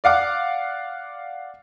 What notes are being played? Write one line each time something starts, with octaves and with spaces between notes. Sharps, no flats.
D5 F5 F#5 D6